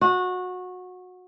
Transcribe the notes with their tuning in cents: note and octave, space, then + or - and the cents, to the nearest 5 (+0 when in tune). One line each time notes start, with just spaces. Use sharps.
F#4 -20